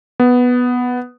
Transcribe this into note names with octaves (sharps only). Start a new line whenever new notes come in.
B3